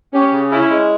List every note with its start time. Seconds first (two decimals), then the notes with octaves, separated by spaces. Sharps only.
0.13 C#4 G4
0.32 C#3
0.51 C#4 E4
0.70 G#3